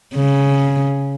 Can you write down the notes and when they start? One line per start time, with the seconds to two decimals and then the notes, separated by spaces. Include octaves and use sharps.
0.15 C#3